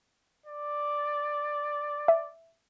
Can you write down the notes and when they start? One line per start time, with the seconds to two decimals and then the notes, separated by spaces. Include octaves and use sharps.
0.46 D5
2.08 E5